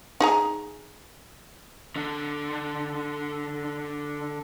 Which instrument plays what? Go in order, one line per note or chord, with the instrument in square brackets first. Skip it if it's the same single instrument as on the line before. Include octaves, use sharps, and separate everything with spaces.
[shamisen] D#4 G#4 A#5
[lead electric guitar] D3 D4